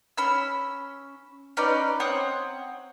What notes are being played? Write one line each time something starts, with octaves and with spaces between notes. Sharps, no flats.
C#4 B5 E6
C#4 D#4 B4 D5
C4 C#5 F#5 D#6